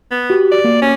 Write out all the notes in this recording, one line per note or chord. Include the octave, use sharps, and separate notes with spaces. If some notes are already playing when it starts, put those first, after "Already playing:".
B3
F#4 G4
D5
A#3
C#4